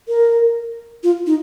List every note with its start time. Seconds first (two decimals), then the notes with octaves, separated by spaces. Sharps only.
0.08 A#4
1.03 F4
1.27 D#4